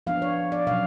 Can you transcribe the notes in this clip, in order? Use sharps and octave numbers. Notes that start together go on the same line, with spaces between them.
F3 B3 D4 F5
C#5
D5
B2 F#3 C#4 F5